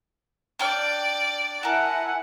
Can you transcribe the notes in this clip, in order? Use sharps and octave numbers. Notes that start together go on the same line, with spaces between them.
D4 D5 G5 F6
E4 A#4 E5 F#5 G#5 A5